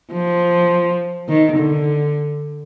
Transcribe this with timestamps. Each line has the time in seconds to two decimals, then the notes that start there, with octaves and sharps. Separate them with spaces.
0.12 F3
1.29 D#3
1.57 D3